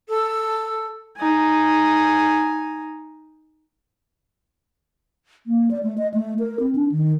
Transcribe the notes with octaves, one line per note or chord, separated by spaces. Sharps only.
A4 E6
D#4 G#5
A#3
D5
A3
D#5
A3
A#4
C4
D4
D#3